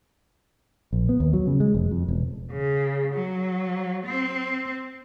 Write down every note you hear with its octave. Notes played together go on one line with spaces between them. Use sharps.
A#1
B3
D#2
F#3
C#3
G#3
F1
F2
E1
C#3
F#3
C4